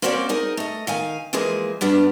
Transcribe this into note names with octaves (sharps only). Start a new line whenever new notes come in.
A#3 C4 C#4 F#4 C5 D5
D#4 G#4 A#4
A3 D#5
D#3 F5 G#5
E3 F3 G#3 A#3 G#4
G2 G3 B3 D4